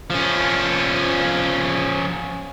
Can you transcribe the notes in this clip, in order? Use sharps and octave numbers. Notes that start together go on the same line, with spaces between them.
F3 C#4